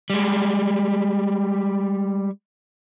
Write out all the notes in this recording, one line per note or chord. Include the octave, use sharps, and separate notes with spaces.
G3 G#3